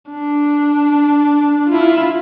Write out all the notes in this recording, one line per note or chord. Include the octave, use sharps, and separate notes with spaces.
D4
E4 F4